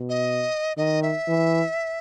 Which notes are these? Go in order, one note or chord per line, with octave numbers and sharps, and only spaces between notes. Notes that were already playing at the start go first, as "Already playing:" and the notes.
Already playing: B2
D#5
D#3 D#5
E5
E3